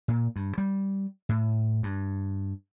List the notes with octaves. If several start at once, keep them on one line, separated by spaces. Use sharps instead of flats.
A#2
G2
G3
A2
G2